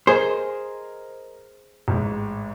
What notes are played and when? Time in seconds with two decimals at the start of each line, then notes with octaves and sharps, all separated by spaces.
0.07 G#4 A#4 C5 D#5
1.88 A1 G#2